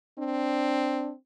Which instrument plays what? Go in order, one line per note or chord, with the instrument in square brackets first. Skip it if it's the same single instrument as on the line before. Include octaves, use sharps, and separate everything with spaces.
[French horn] C4 [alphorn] D4